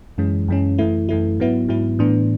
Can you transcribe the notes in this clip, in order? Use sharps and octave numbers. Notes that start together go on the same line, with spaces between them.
F#2 E3 G#3 C#4
F#2 E3 G#3 C#4
F#2 E3 A3 E4
F#2 E3 A3 E4
G#2 F#3 B3 E4
G#2 F#3 B3 E4
A2 E3 B3 D4